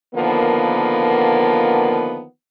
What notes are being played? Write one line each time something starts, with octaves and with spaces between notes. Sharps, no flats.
D3 D#3 F3 A#3 B3